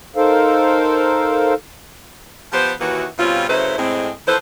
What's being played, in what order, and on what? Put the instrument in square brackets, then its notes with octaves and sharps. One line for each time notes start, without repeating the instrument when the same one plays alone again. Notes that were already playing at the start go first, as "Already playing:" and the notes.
[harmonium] D#4 A4 A#4 C5 F5
[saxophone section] F3 B3 G4 C5
D#2 E3 F#4
B2 G3 C4 C#4 F4
C#3 F#3 A3 E4 B4 C5
A2 G#3 C4
E3 F3 A4 B4 C5